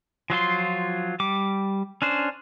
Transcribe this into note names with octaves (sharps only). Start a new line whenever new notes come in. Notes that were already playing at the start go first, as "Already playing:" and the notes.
F3 F#3 F4 C6
G3 D6
C#4 D4 C5